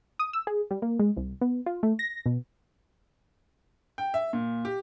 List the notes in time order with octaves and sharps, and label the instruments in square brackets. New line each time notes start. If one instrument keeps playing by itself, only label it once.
[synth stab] D#6
E6
G#4
G3
A#3
G#3
C2
B3
F4
A3
A#6
B2
[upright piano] G5
E5
A#2
G4